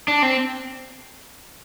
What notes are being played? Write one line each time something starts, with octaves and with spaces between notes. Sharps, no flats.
D4
C4